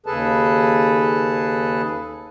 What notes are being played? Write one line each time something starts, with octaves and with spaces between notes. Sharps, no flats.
D#2 C#3 G#4 A4 B4 A5